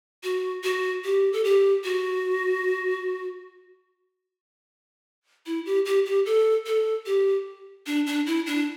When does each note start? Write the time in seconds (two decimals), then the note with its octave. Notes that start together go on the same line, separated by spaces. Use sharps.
0.23 F#4
0.63 F#4
1.04 G4
1.33 A4
1.44 G4
1.84 F#4
5.46 E4
5.66 G4
5.85 G4
6.06 G4
6.26 A4
6.66 A4
7.06 G4
7.86 D4
8.07 D4
8.26 E4
8.46 D4